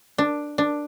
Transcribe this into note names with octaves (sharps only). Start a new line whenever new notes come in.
D4
D4